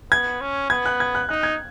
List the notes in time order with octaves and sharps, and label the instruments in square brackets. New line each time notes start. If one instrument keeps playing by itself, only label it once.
[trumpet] B3 [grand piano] G#6
[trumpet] C#4
[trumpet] B3 [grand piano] G#6
[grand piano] F#6
G#6
F#6
[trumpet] D#4 [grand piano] F#6
[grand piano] G#6